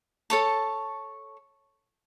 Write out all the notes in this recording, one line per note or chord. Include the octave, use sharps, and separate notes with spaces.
A4 C#5 A5